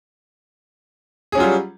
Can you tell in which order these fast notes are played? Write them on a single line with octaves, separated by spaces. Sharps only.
G#4 C#4 F#3 F4 G3